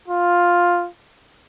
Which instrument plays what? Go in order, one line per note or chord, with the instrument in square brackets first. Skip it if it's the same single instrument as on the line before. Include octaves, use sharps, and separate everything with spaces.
[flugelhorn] F4